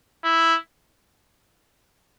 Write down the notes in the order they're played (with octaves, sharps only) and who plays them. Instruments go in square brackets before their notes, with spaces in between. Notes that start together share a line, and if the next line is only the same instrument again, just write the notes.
[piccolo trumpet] E4